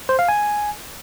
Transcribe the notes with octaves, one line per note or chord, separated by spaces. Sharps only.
C5
F5
G#5